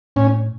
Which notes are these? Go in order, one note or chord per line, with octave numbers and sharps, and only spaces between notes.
A2 C#4